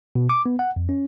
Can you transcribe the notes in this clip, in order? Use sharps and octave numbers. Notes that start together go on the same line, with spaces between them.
B2
D6
B3
F#5
F2
C#4